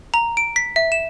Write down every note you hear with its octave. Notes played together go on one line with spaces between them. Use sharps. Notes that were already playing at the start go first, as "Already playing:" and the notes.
A#5
D7
B6
E5
E7